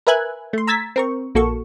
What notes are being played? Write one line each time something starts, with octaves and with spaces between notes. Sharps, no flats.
A#4 B4 E5 G#5 F#6 G#6
A3 C6
A#5 E6 G#6 A6 B6
C4 A#4 C#6
A#1 A#3 F#4 A4 C#6